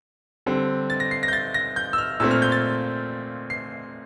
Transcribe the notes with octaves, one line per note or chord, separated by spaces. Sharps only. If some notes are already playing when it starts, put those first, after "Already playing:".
D3 G3 C4
A6
A#6
C7
A#6
G6
A6
A#6
G6
E6
F6
A#2 A3 C4 E6
F6
G6
A6
C7